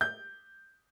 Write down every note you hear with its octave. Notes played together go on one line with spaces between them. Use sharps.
G6